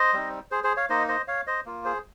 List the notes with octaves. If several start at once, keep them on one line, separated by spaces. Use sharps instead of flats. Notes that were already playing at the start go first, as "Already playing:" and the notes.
Already playing: C5 D#5
G3 C4 D#4
G#4 C5
G#4 C5
C#5 F5
A#3 D#4 C5 D#5
C5 D#5
C#5 F5
C5 D#5
A#3 F4
G#4 C5